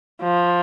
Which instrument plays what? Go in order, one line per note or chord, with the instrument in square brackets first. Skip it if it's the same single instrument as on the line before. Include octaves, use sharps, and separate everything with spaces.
[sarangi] F3